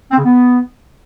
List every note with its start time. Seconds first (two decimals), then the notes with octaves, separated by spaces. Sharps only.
0.11 C4
0.18 C#3
0.25 B3